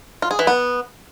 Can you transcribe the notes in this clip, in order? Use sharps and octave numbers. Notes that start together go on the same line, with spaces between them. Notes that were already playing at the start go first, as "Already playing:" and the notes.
F4
G#4
E3
B3